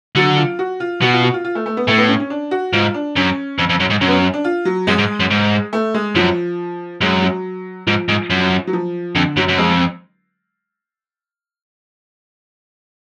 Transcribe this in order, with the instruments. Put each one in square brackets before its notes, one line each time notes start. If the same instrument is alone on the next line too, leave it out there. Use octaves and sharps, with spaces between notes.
[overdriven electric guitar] D3 [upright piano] F#3
[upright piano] F4
F#4
F4
[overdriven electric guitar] B2 [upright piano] F#4
[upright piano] F4
F#4
F4
F4
A3
A3
B3
[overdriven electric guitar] A2 [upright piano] A3
[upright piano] B3
C#4
C#4
D4
F#4
[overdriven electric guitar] G#2 [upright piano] F4
[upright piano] D4
[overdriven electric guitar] F#2 [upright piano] C#4
[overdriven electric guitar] F2
F2
F#2
G#2
[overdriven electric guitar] F#2 [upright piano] C#4
[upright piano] B3
C#4
D4
F4
F#3
[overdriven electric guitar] F#2 [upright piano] G#3
[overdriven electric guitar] G#2
F#2
G#2
[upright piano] A3
G#3
[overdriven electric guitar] F#2 [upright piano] F3
[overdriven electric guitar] F#2 [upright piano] G#3
[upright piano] F#3
[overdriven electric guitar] G#2 [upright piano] F3
[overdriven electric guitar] G#2
F#2
[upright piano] F#3
F3
[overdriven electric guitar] F2 [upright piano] D3
[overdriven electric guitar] F#2 [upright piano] F#3
[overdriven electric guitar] F#2
[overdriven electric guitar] F2 [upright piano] G#3